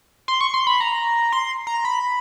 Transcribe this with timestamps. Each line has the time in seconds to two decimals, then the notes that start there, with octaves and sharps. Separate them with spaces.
0.28 C6
0.41 C#6
0.54 C6
0.67 B5
0.80 A#5
1.32 C6
1.67 A#5
1.85 B5